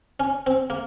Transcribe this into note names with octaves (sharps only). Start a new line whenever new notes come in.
C#4
C4
A#3